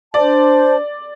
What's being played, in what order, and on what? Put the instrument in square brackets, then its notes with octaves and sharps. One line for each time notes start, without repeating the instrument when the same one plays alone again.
[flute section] D4 C5 A5 [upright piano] D5